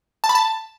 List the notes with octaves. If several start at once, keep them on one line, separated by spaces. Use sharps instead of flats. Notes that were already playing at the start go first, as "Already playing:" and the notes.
A5
B5
A5